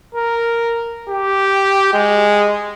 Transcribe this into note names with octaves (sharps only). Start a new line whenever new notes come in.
A#4
G4
G#3